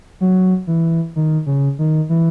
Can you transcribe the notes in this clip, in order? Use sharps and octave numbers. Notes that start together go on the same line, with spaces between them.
F#3
E3
D#3
C#3
D#3
E3